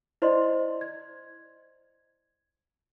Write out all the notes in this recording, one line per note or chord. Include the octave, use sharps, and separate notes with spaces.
E4 C5 D5 D#5 C6
G#6